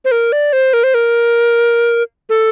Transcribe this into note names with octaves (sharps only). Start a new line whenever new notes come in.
C5
A#4
D5
C5
A#4
C5
A#4
A4